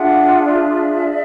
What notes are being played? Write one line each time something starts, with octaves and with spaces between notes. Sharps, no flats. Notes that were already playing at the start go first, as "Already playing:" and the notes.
Already playing: D4 F4 G#4 E5 F#5
D5 E5
G#4